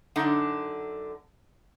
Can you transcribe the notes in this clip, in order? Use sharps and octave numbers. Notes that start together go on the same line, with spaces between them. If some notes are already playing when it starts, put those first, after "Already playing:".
F#2 D3 D4 D#4 F#5